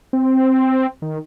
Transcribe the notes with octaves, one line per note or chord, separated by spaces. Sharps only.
C4
D#3